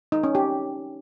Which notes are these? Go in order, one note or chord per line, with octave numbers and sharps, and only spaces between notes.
D#4
C#4
G4